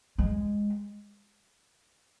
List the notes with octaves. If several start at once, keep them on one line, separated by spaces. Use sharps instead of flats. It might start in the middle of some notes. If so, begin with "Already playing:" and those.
G#3